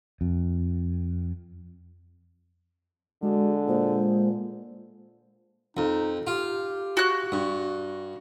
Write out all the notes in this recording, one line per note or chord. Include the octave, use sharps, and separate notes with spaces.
F2
D3 G#3 F#4
A#2 C5
F2 D#4
F4 G4
F#4 F#6
G2